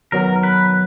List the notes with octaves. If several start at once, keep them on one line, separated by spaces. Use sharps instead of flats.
D#3 F#3 B3 A#4
B4